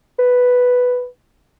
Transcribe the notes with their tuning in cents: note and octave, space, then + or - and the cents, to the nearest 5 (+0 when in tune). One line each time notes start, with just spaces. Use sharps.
B4 +0